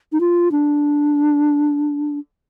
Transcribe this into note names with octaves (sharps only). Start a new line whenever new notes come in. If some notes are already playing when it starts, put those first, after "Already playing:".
D#4
F4
D4